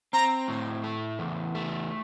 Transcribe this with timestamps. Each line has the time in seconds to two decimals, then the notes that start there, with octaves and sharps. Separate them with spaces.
0.13 C4 A#5
0.48 A2
0.84 A3
1.19 E2
1.55 A3